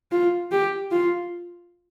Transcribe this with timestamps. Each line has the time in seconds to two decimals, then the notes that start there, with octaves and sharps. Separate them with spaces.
0.12 F4
0.52 G4
0.91 F4